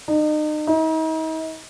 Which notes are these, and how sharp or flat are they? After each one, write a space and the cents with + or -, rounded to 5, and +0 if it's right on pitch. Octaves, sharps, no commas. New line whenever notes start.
D#4 -35
D#4 +40